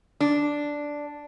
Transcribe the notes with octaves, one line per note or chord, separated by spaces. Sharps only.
D4